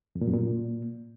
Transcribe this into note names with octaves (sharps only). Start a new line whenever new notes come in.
F2
A#2
F#2
A#2